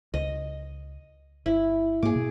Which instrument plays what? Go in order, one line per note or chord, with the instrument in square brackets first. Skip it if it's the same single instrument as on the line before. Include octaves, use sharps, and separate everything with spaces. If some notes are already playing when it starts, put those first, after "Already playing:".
[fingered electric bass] C#2 [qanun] D#5
[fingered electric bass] G1 [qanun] E4
[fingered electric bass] G#2 A#3 [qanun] G#4 D6
[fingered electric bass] B2